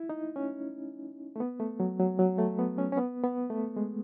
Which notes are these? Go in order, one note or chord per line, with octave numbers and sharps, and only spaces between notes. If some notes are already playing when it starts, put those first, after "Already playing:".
Already playing: E4
D#4
C#4
A3
B3
A3
F#3
F#3
F#3
A3
B3
C#4
C#4
B3
B3
A3
G#3